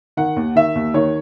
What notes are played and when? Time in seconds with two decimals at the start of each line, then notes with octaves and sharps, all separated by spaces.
0.17 D#3 F#5
0.36 D#2
0.56 D#3 E5
0.75 D#2
0.94 D#3 C#5